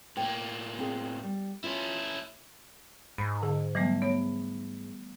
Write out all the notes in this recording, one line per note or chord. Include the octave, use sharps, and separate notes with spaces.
A2 A#3 G5
C4 G#4
G3
C#4 E4 F4
G#2 B5
D3 G#4
E3 F#3 G3 A3 B3
B3 C#5